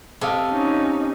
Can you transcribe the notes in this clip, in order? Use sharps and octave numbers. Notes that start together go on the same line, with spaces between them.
C3 A4 D#5 F5
C#4 D#4